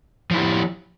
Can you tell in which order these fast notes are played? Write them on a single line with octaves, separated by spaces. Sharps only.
F3 E4 G4